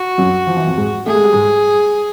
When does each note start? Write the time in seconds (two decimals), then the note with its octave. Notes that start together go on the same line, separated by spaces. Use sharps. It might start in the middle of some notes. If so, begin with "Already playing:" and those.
Already playing: F#4
0.18 F#2 F#3
0.47 F3
0.57 E3
0.67 F2 F3
0.77 G#2 G#3
1.06 A3 G#4
1.15 G#3
1.24 G3
1.33 G#2 G#3